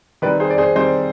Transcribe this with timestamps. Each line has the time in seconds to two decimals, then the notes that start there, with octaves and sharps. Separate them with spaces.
0.22 D#3 G3 C4 B4 D5
0.40 G#4 C5
0.50 D5
0.58 G#4 C5
0.75 D#3 G3 C4 C5 D#5